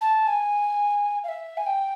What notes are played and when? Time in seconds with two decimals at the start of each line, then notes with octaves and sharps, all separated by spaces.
0.01 A5
0.27 G#5
1.24 F5
1.28 E5
1.57 G#5
1.67 G5